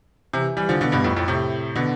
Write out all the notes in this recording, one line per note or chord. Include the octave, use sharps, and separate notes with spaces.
C3 E3
E3 G3
D3 F3
B2 D3
G2 B2
F2 A2
F2 A2
A2 C3
B2 D3